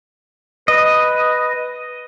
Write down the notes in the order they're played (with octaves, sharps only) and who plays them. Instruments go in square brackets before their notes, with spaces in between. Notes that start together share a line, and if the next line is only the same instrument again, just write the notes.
[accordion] B4 [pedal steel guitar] D#5